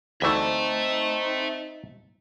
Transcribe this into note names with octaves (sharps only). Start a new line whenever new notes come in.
D2 E3 A3 C4 D#4 E5 A5